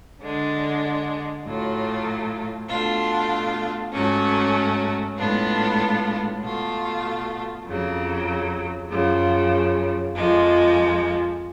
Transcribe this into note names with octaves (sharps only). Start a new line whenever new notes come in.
D3 G#3 D4
A2 F#3 A3 F4
B2 A3 D4 F4
G#2 F#3 A3 C#4
A2 G#3 B3 D4 F4
B2 A3 F4
F2 C#3 F#3
F#2 C#3 F3
F2 F3 G#3